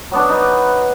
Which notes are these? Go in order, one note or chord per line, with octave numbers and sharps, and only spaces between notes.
F#3 B3 D4
D#4 B4